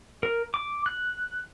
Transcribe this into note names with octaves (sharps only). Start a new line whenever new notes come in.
A#4
D6
F#6